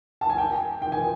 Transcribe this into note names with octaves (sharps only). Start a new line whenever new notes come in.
A5
G#5
G5
G5
G#5